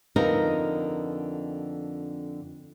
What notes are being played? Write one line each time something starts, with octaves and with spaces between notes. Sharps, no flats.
F2 D3 B3 D#4 A#4